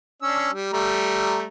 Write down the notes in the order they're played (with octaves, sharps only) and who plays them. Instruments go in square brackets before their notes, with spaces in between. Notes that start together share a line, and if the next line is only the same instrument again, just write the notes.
[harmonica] C#4 D4 E6
G3
G3 A3 A#5